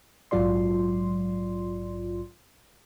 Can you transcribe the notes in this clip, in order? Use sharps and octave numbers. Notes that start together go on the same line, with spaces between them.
A#1 G#2 F#3 F4 D5 C6